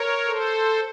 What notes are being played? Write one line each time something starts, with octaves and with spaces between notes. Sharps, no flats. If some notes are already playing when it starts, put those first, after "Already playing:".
Already playing: A#4 C#5
A4 C5